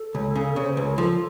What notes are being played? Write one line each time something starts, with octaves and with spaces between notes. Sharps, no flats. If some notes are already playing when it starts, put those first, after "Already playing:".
Already playing: A4
C#2
C#3
C#3
C5
C#2 B4
A#4
F3 A4